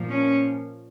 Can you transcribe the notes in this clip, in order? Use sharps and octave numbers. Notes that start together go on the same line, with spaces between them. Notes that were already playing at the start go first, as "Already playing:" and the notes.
Already playing: A#2 F3
C#4